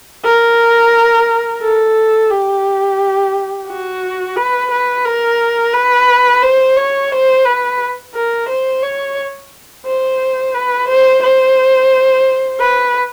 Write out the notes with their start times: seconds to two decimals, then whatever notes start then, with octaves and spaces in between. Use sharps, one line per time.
0.24 A#4
1.62 A4
2.30 G4
3.68 F#4
4.36 B4
4.71 B4
5.05 A#4
5.74 B4
6.42 C5
6.77 C#5
7.11 C5
7.45 B4
8.14 A#4
8.49 C5
8.82 C#5
9.86 C5
10.54 B4
10.88 C5
11.23 C5
12.60 B4